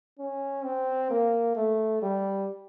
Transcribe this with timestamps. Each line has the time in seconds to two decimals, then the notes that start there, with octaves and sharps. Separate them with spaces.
0.19 C#4
0.64 C4
1.10 A#3
1.56 A3
2.02 G3